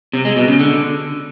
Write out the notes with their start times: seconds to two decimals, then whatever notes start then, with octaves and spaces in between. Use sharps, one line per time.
0.13 C3
0.25 G#3
0.36 B2
0.48 C#3
0.59 D3